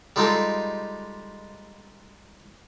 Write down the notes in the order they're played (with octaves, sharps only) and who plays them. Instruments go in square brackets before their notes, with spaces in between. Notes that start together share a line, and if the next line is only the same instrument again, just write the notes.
[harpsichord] G3 G#3 D#4 F4 G4 A4